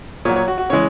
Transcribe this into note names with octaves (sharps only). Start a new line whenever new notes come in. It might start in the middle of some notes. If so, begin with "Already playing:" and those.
A#2 F#3 C#5
C#5
F#4
F#4
C#3 E3 G#3 C#5